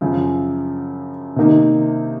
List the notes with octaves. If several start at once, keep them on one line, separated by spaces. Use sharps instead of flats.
F#2 C#3 F3
C3 D#3 A#3 D#4